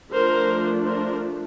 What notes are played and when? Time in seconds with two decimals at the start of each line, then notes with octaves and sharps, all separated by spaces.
0.12 F3 A3 D4 A#4 C5
0.86 A#4 C5